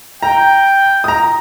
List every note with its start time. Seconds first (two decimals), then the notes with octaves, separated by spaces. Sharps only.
0.23 G5 A#5
1.04 A#5 D#6